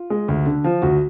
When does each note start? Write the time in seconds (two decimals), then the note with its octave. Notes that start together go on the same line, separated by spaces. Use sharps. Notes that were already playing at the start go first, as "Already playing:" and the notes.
Already playing: F4
0.10 G#3
0.28 D2
0.46 D3
0.64 F3
0.82 D2 F#4